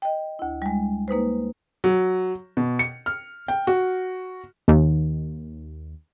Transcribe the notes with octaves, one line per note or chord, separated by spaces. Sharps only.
D#5 G5
D2 E4
G3 G#3
A#3 D#4 B4 C5
F#3
B2
C#7
F6
G5
F#4
D#2